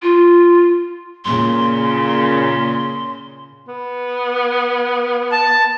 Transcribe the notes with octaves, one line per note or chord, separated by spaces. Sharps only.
F4
A#2 C#3 C6
B3
A5